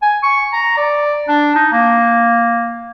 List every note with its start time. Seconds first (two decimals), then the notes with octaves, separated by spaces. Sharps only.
0.02 G#5
0.23 C#6
0.53 A#5
0.77 D5
1.28 D4
1.56 D#4
1.72 A#3